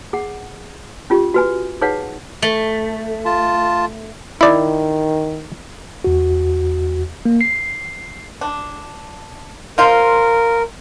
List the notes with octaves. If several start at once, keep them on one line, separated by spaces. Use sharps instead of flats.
G#4 F#5
C#4 F4 G4
F#4 B4 G#5
D#4 G#4 B4 C#5 F5 F#5
A3
F4 A5
D#3 E4 D5
E2 F#4
A#3
C7
D4
F3 F4 A#4